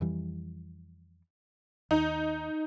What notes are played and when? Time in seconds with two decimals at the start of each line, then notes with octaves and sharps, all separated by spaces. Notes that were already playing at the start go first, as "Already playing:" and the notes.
0.01 F2 E3 G3
1.91 D#2 D#4